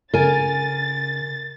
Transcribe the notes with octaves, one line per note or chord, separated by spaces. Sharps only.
C#3 A#4 G#5 A6